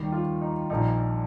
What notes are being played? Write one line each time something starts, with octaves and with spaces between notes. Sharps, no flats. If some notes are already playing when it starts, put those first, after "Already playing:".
Already playing: D#2 D#3 G3
F4
D#4
A#1 A#2 F3 D#4